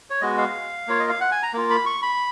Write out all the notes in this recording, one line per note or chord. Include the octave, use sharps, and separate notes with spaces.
C#5
G#3 B3 F#4 D#5
F5
A#3 F4 C#5
D#5
F5
F#5
G#5
A#5
A#3 F4
B5
C#6
B5